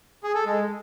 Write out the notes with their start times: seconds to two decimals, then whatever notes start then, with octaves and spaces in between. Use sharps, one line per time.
0.23 G#4
0.35 A4
0.46 G#3